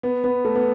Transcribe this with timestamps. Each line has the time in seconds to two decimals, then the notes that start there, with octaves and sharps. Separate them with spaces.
0.03 B3
0.24 B3
0.45 A3
0.55 B3